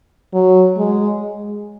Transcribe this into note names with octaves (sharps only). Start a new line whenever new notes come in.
F#3
G#3